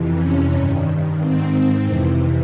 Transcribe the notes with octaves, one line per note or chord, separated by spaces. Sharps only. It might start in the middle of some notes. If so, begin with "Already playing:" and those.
Already playing: F2 C3 E3
C#4
G2 D#3 C#4
G#2 D#3 C4
F2 C3 E3 C4